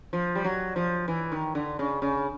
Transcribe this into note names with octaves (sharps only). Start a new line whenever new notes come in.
F3
G3
F#3
F3
E3
D#3
D3
C#3
C#3